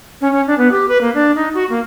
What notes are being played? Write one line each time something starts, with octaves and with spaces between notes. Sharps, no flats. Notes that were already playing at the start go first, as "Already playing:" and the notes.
C#4
C#4
D4
B3
G4
B4
A#3
D4
D#4
F#4
A#3